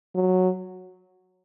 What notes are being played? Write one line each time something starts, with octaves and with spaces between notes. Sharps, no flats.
F#3